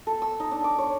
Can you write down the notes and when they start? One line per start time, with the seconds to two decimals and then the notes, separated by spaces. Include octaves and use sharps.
0.07 A4
0.22 E6
0.40 D#4
0.51 D4
0.64 D6
0.78 C#5